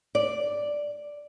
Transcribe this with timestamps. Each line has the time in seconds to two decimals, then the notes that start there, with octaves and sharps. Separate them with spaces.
0.15 D5